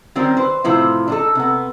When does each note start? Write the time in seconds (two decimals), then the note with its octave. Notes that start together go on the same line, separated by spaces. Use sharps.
0.15 D#3 G3 C4 C#4 G4 A#4
0.37 B4 C5
0.64 A2 C3 F3 E4
1.08 D4 D#4 A4
1.35 C3 B3